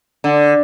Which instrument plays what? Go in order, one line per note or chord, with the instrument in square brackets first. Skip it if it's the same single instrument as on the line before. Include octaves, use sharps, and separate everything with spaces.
[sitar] D3